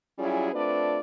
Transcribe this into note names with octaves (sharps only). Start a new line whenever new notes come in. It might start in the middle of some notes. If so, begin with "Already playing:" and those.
F#3 G3 C#4 E4 F4 G#4
A3 C4 D4 F4 B4 D5